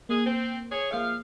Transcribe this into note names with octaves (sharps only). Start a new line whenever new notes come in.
A#3 G#4
C4
G#4 C#5
F3 A#3 G#4 E5 F5